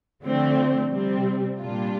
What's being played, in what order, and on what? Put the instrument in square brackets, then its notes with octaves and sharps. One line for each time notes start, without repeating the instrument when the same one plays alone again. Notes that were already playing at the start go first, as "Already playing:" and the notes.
[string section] D3 F3 A3 C4
C3 G3 C4
A#2 G3 D4 F4